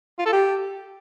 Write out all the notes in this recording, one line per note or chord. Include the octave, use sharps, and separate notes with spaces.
F4
A4
G4